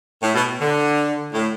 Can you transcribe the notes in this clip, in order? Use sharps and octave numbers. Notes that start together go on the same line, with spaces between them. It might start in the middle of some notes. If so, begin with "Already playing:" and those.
A2
B2
D3
A2